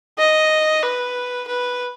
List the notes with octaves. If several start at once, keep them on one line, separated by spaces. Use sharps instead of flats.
D#5
B4
B4